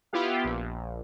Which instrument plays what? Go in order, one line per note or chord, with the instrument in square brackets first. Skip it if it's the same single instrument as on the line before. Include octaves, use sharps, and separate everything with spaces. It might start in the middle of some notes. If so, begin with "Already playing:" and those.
[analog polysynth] B3 E4 F4 G4 F5
A#1